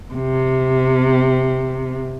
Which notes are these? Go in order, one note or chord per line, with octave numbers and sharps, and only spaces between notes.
C3